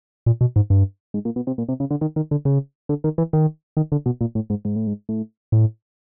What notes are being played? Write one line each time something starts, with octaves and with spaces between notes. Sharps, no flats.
A#2
B2
G#2
G2
G#2
A#2
B2
C3
A#2
C3
C#3
D3
D#3
D#3
D3
C#3
D3
D#3
E3
D#3
D#3
D3
B2
A#2
A2
G#2
G#2
A2
G#2
A2
A2